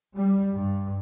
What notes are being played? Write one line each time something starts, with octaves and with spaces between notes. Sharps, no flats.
G3
G2